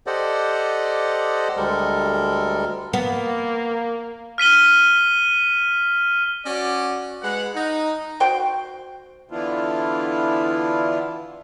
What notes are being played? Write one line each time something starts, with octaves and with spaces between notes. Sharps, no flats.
G4 A4 C5 D5 D#5 F#5
D2 G3 G#3 A4 A#4
A#3 B3
F6 B6 D#7 G7
C#4 F#4 D5
G#3 B4 F#5
D#4
F#4 C5 G5
D3 E3 B3 D4 E4 F4